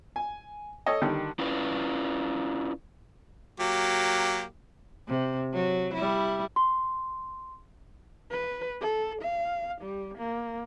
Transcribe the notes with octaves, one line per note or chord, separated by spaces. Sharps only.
G#5
A4 C#5 D#5
D3 D#3 G3
C#4 E4 F4 B4 D5
F#3 A#3 G4
C3
F#3
G3 E4
C6
B4
A4
F5
G3
A#3